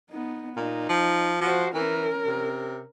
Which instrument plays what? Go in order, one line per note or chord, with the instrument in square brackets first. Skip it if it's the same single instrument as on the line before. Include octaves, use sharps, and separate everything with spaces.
[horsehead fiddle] B3 D#4
[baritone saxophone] A#2 [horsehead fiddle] D#4
[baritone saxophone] F3
[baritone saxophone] F3 [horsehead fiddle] F#4 C5
[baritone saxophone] E3 [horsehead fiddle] C#4 A#4
[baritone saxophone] C3